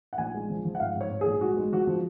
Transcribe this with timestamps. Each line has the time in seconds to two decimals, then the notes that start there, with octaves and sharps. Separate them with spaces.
0.13 F#5
0.18 A#1 G#5
0.34 G#3
0.50 F3
0.65 F3
0.75 F#5
0.80 G#2 F5
0.95 G#2
1.01 C#5
1.11 G#2
1.21 A#1 G#4
1.41 G#3 F#4
1.57 G#3
1.72 F3 F#4
1.87 F3